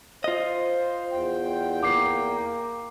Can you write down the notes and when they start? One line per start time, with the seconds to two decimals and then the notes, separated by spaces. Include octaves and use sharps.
0.24 F4 C5 D#5
1.12 E2 G5
1.83 A#3 D6 C7